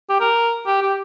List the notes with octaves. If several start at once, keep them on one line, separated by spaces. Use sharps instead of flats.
G4
A#4
G4
G4